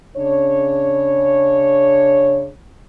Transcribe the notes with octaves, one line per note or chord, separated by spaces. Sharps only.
C#3 D4 C#5